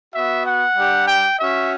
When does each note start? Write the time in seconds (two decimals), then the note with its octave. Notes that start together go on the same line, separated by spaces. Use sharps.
0.14 B3 F#4 E5
0.46 F#5
0.77 G3 D4 G4
1.07 G5
1.39 C#4 F#4 E5